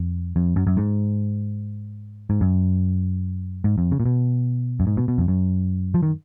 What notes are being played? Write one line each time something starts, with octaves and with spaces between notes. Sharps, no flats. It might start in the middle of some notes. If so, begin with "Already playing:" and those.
Already playing: F2
F2
F#2
F#2
G#2
G#2
F#2
G#2
F2
C#3
A#2
B2
F#2
G#2
B2
B2
F2
F#2
F3
D#3